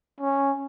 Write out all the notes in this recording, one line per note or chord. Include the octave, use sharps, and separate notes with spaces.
C#4